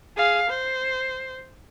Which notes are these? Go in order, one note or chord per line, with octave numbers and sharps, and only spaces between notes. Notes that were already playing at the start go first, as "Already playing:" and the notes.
G#4 F5
C5